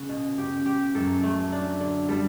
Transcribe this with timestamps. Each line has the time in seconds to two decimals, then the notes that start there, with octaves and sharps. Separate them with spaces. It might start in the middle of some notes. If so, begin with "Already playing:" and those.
Already playing: C#3 F#4
0.09 B2
0.38 C#3 G4
0.66 G4
0.94 F#2 F#3 A4
1.23 A3
1.52 D4
1.80 D3
2.09 G3 A4